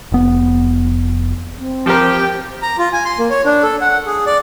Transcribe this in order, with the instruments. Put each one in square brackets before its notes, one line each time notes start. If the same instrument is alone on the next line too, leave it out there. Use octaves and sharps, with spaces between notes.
[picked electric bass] F1 B3
[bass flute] C4
[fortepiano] F3 A#4 [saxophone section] G4
[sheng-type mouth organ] A#5
F4
G#5
C6
A#3
C#5
D4
A4
F#5
G#4
D5